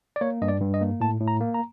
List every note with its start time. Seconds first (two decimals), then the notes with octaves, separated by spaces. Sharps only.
0.16 D5
0.21 A#3 C#5
0.42 G2 D#5
0.48 D5
0.61 G2
0.74 D#5
0.81 A#3
1.00 A2 A5
1.21 A2
1.28 A#5
1.41 A#3
1.54 A#5